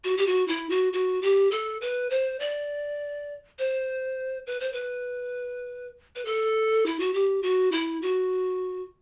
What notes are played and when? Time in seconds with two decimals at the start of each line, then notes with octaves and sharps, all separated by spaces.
0.04 F#4
0.17 G4
0.27 F#4
0.48 E4
0.70 F#4
0.93 F#4
1.22 G4
1.51 A4
1.81 B4
2.10 C5
2.40 D5
3.59 C5
4.47 B4
4.60 C5
4.73 B4
6.16 B4
6.25 A4
6.86 E4
6.99 F#4
7.14 G4
7.43 F#4
7.72 E4
8.02 F#4